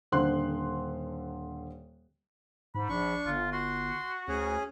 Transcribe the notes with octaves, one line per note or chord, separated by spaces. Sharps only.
D#1 D3 C5 C6 F#6
G#2 B5
A#1 D4 C#6
G1 F4
F#4 C6
D2 C#4 G#4